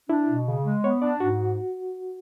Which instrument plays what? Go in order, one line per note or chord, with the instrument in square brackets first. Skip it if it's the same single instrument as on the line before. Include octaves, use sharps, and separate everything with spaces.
[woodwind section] D4 [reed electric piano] E4
[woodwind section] B2
C#3
G#3
[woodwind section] B3 [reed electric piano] C#5
[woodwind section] D4 [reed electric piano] D5
[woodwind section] G#2 [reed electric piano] F#4